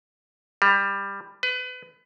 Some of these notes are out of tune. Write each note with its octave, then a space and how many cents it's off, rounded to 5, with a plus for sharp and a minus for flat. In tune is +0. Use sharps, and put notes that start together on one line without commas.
G3 +15
B4 +30